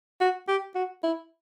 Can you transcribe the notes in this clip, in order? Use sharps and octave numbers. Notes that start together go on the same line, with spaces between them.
F#4
G4
F#4
E4